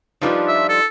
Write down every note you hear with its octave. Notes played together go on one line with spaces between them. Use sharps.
F3 G3 D4 D#4 F4 B4
E5
A4